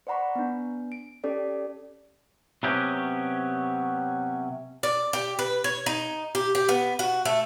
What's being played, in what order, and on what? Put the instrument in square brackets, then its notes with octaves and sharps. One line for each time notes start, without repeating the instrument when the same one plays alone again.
[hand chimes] C5 D5 F#5 A#5 B5 C#6
B3 D4
D7
C#4 G4 A4 D5
[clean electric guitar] C3 F#3 B3 C#4 G4
[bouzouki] D5
G4
B4
C#5
D#4
G4
G4
B3
F#4
A3